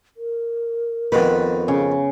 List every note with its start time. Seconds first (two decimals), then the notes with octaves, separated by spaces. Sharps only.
0.17 A#4
1.12 F2 D#3 B3 B4
1.68 C#3